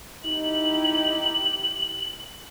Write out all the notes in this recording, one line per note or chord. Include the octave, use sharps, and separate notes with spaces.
D#4 E4 G4 F#7